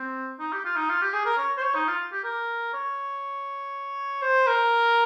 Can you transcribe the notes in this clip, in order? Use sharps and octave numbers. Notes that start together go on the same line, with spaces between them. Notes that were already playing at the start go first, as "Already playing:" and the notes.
Already playing: C4
D#4
G4
F4
D#4
F4
G4
G#4
A#4
C#5
C5
C#5
D#4
F4
G4
A#4
C#5
C5
A#4